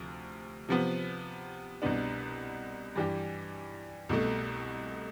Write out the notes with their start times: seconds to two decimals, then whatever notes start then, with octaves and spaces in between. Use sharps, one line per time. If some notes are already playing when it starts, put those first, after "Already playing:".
Already playing: D2 C3 F3
0.69 C3 F3 B3
1.82 C2 B2 B3 D4
2.96 G2 E3 G3 D4 G4
4.09 C2 B2 A3